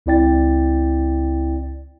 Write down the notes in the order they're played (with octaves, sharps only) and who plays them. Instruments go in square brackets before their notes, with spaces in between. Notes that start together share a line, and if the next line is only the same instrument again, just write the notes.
[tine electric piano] C#2 C4 E4 D5 G5 A6